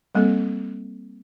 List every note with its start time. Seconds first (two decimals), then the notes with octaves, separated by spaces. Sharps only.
0.15 G3 A#3 C4 A4